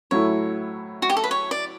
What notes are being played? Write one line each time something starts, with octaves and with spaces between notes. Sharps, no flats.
A2 F#3 A3 E4 C#5
F#4
G4
A4
B4
C#5
D5